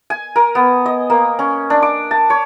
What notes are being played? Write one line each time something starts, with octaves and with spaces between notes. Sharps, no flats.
G#5
A#4
B3
D#5
A#3
C#4
D4
D6
A5
C#5